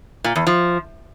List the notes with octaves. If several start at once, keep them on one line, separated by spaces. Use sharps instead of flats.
A#2
E2
F3